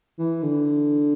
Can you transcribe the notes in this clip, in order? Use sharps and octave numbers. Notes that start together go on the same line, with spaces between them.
E3
D3